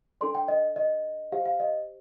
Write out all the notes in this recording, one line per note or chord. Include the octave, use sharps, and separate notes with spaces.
D4 A4 D5 C6
G5
D#5
D#5
G4 C5 F5
F5
D#5